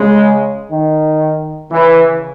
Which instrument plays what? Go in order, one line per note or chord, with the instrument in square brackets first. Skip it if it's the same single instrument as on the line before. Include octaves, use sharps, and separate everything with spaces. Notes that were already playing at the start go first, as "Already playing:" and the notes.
Already playing: [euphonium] C#3 [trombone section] G#3
[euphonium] D#3
[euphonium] C#3 [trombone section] E3